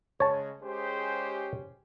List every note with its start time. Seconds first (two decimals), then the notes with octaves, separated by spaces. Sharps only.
0.20 C#3 G#3 C#5 A5
0.62 G#3 C#4 G4 G#4 C5